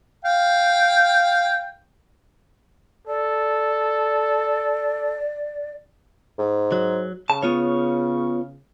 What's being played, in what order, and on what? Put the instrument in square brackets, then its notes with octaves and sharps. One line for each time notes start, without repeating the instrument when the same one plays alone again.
[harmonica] F5 G5
[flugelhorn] A4 [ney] D5
[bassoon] G#2
[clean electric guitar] F#3
[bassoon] C#3 [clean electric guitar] A5
[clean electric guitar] B3 F4 C#5